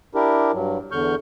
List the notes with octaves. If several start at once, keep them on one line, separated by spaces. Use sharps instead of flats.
D4 E4 G4 A#4
G2 F#3
E2 D3 C#6 F6 G6